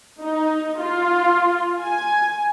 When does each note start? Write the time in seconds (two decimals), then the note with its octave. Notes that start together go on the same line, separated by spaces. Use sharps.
0.21 D#4
0.80 F4
1.83 G#5